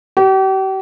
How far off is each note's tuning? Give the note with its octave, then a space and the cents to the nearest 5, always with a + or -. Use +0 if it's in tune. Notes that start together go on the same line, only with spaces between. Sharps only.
G4 -40